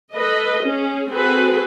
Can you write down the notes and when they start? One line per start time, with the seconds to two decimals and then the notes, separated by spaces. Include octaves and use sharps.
0.13 A4 B4 D#5
0.64 C#4 G#4
1.10 C4 F#4 G#4 A4 B4